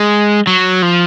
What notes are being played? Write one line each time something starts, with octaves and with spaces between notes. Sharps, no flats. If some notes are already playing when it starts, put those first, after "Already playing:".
Already playing: G#3
F#3
F3